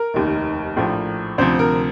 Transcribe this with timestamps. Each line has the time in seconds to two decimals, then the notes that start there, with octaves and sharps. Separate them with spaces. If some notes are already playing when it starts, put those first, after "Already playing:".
Already playing: A#4
0.14 F1 D#2 D#3
0.77 A#1 A2 F3
1.38 D2 C3 F3 C5
1.59 A#4